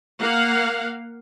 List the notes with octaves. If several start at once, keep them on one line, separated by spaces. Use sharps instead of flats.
A#3 F5 F#5